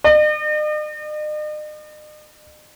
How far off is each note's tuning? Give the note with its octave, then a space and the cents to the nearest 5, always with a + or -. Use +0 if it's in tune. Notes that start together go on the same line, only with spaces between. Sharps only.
D#5 -45